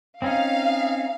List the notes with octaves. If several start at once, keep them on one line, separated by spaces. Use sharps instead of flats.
C4 C#4 D#4 F5